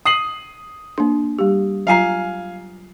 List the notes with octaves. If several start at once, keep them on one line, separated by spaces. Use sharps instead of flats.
D#6 C7 F#7
A#3 D4
G3 G4
F#3 F4 F5 G#5 A#5 C7